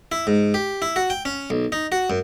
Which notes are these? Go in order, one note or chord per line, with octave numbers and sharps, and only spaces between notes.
E4
G#2
G4
E4
F#4
G5
C#4
B1
D#4
F#4
F#2